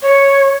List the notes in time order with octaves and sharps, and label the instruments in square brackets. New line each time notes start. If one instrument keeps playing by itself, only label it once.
[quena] C#5